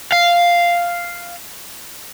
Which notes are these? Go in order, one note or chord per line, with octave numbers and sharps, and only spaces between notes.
F5